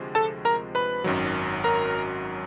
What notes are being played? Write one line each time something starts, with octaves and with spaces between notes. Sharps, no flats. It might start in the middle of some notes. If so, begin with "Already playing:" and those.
Already playing: D2 C3 F3 G#3
A4 A5
A#4 A#5
B4 B5
G#1 F#2 D#3 F#3
A#4 A#5